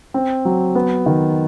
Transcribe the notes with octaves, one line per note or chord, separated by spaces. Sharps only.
C4
F#3
B3
D#3